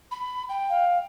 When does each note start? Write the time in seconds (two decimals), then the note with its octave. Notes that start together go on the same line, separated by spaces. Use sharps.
0.11 B5
0.49 G5
0.69 F5